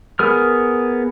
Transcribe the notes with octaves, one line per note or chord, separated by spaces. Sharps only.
B3 G#4 A#4 F6